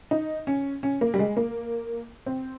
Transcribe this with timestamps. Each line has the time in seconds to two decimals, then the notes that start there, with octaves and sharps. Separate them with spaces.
0.11 D#4
0.47 C#4
0.83 C#4
1.01 A#3
1.14 G3
1.19 G#3
1.37 A#3
2.26 C4